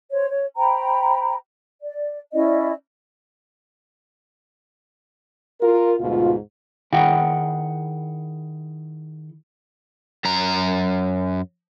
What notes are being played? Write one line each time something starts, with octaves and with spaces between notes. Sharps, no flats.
C5 C#5
C#5
C5 G5 A#5 B5
D5
C#4 E4 D5 D#5
F4 A#4
D2 G#2 B2 F4
D#3 E4 G#4 F#5 G5
F#2 A#5